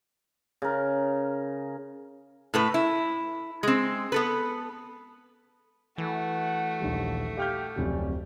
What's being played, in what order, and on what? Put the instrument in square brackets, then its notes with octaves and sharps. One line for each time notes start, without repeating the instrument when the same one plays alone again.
[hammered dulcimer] C#3 A#4
[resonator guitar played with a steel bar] A2 A3 B4
E4
G#3 C4
B3 A4 B4
[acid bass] E3 [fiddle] A3 F#4 [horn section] F#5
[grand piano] A#1 D#2 G3
[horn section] G4 [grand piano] F5 F6 G6
[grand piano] D1 F2 C3 [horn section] C#4 D5